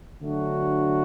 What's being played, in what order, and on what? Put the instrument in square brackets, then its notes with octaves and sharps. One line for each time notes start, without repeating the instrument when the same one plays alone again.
[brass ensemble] D3 F#3 A3 D4 F#4